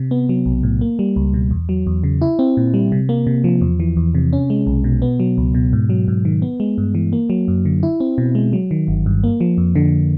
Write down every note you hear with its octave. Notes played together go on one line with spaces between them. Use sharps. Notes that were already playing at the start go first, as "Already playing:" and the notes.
Already playing: C3
B3
F#3
B1
A2
A#3
G3
C#2
B2
E2
F#3
E2
C#3
E4
C4
A#2
G3
C3
A#3
C3
F3
E2
E3
E2
C3
C#4
G#3
B1
B2
B3
F#3
C#2
B2
G#2
F#3
G#2
D#3
B3
G#3
G2
E3
A#3
F#3
F#2
D3
E4
C4
B2
G#3
F#3
D#3
G1
G2
A#3
F3
F2
D3